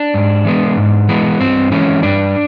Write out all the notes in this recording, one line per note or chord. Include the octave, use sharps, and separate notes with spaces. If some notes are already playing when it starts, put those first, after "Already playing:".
Already playing: D4
G#2
E3 G#3 B3
G#2
E3 G#3 B3
G2 C4
E3 G#3 C#4
G2 D4